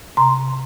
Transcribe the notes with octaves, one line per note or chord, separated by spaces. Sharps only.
C3 A#5 C6